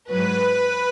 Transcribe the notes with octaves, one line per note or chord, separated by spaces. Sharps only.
G#2 F#3 B4